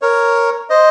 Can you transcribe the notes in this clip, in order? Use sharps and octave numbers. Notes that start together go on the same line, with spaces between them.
A#4 C#5
C5 D#5